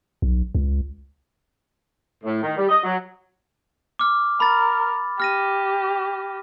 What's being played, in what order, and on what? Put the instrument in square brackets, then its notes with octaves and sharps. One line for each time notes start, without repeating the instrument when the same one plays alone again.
[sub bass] B1
C#2
[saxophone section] A2
D#3
G3
D#5
F#3
[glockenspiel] D6 F6
[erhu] A#4 [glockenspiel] B5 A6
[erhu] G4 [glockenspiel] F6 A#6 D#7